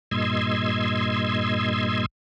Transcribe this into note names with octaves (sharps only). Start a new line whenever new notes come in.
G2 A#2 D#5 C6 E6 G#6